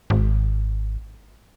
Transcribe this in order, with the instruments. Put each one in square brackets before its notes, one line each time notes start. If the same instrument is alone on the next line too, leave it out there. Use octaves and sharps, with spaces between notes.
[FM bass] G#1